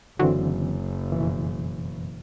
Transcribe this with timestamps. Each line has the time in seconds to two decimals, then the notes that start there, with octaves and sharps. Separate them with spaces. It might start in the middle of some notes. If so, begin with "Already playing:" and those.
0.19 F#1 D3 E3 F#3 C4
1.12 F2 B2 E3